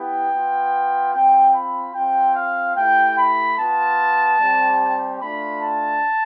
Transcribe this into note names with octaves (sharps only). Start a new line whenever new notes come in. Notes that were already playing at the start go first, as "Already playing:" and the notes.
Already playing: B3 E4 G4 G5
B3 F4
C4 F4 G5
B5
C4 F4 G5
F5
A3 E4 G4 G5
B5
B3 F4 A5
G3 C4 G4
A3 D4 F4 B5
A5